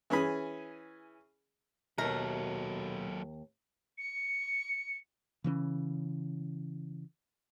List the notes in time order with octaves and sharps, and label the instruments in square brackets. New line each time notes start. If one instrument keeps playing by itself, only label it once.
[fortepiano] E3 C#4 G#4 B5
[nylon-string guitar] D#2 E5 [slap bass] B2 [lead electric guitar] F#3 A4 [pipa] A#4
[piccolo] C#7
[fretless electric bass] C#3 E3 C4 C#4